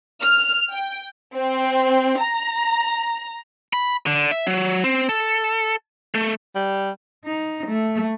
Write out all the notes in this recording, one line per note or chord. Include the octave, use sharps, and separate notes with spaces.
F6
G5
C4
A#5
B5
D3
E5
F#3
C4
A4
A3
G3
D#4
A3